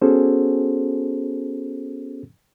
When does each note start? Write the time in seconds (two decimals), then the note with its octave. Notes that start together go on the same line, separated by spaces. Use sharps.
0.02 B3 C#4 F#4 G#4 A4 C5